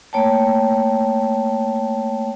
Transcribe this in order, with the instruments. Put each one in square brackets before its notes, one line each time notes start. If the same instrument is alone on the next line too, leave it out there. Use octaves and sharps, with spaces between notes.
[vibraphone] A3 A#3 C#5 G5 A5